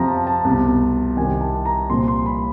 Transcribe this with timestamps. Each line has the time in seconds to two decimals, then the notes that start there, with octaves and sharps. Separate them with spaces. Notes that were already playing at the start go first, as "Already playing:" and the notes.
Already playing: F2 C3 F3 A#5
0.08 A5
0.27 A5
0.45 C2 B2
1.17 C2 C3 D#3 G#5
1.41 A5
1.66 A#5
1.89 C2 A#2 F3 C6
2.08 C6
2.26 B5